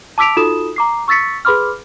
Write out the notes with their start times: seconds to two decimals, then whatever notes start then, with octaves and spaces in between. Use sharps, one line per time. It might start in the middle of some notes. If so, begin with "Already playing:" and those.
0.18 A5 D6 E6 B6 D7 F7
0.37 D#4 F4 F#4 A4 D#6 E7
0.76 A#5 D6 C7
1.08 C#6 E6 A6 B6 C#7
1.45 G#4 B4 B5 C6 D6 F6